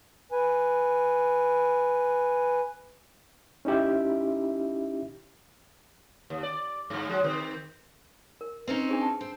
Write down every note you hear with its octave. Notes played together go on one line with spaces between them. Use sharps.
B4 G#5
C#4 D#4 E4 G4 E5
D#2
D5
G2 G#3
F#3 G#3
D#3 C4
A#4
C4 C#4 D#4 B4
D4 G#4 C5
A5
C4